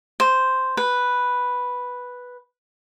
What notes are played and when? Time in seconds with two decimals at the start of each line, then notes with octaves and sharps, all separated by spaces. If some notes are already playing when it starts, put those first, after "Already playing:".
0.20 C5
0.77 B4